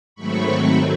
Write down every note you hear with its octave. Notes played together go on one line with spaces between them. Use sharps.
G#2 D#3 F#3 A3 C4 B5 C#6